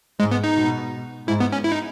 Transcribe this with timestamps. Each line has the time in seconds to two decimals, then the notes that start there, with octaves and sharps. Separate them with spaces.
0.20 G#2 G#3
0.31 B3
0.44 D#4
0.56 B2
1.28 G#2 E4
1.40 B3
1.52 C#4
1.64 E4
1.72 D#4